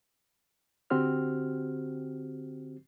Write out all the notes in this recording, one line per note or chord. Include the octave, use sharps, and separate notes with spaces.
D3 C4 F#4 G4 C5 F6